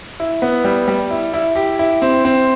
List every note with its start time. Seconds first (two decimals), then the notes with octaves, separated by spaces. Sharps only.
0.20 E4
0.42 B3
0.64 G3
0.88 G3
1.11 E4
1.34 E4
1.56 G4
1.79 E4
2.02 C4
2.25 C4